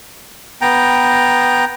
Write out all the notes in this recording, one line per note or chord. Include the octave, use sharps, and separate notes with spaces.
B3 G5 A#5